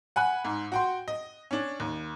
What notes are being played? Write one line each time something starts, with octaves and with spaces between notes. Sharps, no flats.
F#5 G#5 B5 F#6
G#2
F#4 G5 C6
D#5
C#4 D4
D#2